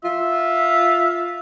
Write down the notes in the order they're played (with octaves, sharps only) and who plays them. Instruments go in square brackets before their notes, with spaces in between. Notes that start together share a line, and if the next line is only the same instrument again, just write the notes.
[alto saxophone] F4 [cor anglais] E5